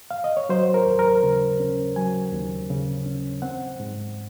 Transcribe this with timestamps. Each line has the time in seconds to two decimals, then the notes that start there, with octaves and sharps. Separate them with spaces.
0.11 F5
0.24 D#5
0.37 C#5
0.49 F#3 C5
0.74 A#4
0.86 D#2
0.99 A#4
1.23 C#3
1.60 C#4
1.96 F#3 G#5
2.32 D#2
2.70 C#3
3.06 C#4
3.42 C4 F#5
3.80 G#2